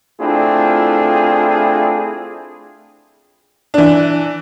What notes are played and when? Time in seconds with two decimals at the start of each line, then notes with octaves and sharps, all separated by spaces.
0.20 A3 C4 D4 E4 F4 G#4
3.74 E3 D4